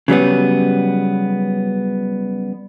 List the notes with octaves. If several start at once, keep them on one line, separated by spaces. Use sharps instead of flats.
C#3 F#3 G3 B3